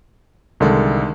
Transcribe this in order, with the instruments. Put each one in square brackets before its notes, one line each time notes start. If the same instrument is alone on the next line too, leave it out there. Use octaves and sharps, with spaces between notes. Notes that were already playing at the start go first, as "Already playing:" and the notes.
[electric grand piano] C2 A4 [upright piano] D3 D#3 G#3